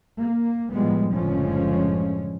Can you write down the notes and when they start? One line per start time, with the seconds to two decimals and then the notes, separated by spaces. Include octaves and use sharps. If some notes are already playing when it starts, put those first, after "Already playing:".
0.18 A#3
0.72 A2 F3 G3 G#3 B3
1.13 F#1 A2 D3 F3 G#3 C#4